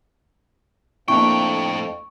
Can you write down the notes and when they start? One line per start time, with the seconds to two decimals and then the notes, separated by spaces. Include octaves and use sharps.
1.08 F2 A2 A#3 D4 E4 G5 C#6